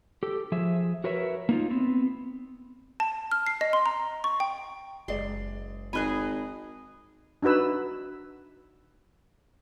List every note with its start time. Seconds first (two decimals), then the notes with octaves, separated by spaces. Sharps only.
0.23 G4 A4
0.52 F3 G#4 E5
1.04 F#4 A#4 B4 C#5 E5
1.49 A#3 D#4 F4
1.70 B3 C4
3.00 A5
3.31 F6
3.47 C7
3.61 D#5
3.73 C6
3.86 A#5
4.24 C#6
4.40 G5
5.08 F#1 G#3 D5 C6
5.93 G#1 G#4 D#5 G#5 B5 F#6
7.43 D4 D#4 F#4 B4 E6